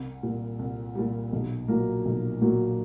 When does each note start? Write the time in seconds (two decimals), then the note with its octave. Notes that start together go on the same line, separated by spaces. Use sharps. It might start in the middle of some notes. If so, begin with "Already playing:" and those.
Already playing: C2
0.23 A#2 G3
0.59 C2
0.95 A#2 G3
1.32 B1
1.68 A#2 F#3 A#3
2.05 B1
2.41 A#2 F#3 A#3